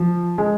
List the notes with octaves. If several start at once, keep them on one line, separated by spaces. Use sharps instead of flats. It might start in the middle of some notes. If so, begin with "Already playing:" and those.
Already playing: F3
G#3